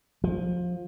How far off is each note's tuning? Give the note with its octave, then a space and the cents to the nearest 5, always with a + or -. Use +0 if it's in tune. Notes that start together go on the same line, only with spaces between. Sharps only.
F3 +20